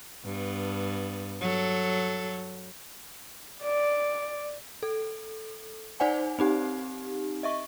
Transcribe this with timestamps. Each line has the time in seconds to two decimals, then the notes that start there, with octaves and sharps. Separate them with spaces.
0.24 G2 B3
1.41 F#3 A4
3.63 D5
4.83 A4
6.00 D#4 C5 D5 F#5 G#5
6.39 C4 D#4 G4
7.43 D#5 E5 C#6